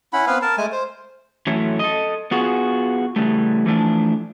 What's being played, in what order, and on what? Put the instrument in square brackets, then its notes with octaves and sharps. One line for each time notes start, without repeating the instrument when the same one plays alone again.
[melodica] C#4 E4 F#5 B5
B3 C4 B4 F5
A#4 A5
G#3 A3 G#5
C5
[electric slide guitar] A2 E3 F#3 A3 C#4 E4
A4 D#5
B3 F4 F#4 G#4
C#3 E3 G3 A3
E3 F3 A3 D4